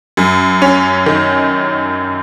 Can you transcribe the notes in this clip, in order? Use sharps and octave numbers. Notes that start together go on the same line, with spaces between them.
F#2
C#4
D#3